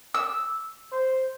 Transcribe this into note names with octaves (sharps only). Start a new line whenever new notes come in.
E6
C5